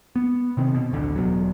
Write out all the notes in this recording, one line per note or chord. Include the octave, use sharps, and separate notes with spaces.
B3
C3 D#3 C4
B2
A1 D2 D3
E1 B2 F#3